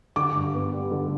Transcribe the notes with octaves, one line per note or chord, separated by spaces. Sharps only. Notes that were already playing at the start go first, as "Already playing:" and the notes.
D3 D6
G2
B3
G3
D3